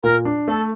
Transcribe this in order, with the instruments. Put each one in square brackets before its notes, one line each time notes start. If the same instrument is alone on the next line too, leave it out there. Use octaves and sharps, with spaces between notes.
[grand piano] A#2 [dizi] A#4
[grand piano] D4
[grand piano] A3 [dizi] A4